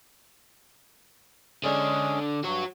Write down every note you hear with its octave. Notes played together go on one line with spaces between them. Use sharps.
D3 G#3 C#4 D4 G#4
G2 F#4 C#5